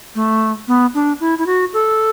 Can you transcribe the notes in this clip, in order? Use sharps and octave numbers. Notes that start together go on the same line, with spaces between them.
A3
B3
D4
E4
E4
F#4
A4